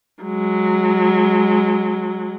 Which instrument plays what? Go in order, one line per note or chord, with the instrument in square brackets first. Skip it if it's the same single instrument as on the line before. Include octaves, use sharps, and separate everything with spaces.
[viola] F#3 G#3